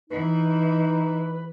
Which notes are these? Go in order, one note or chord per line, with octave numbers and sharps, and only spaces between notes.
E3 D#4 B4